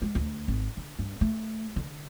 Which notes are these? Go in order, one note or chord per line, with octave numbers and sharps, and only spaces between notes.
G#3
D2
G#1
D3
G2
A3
D3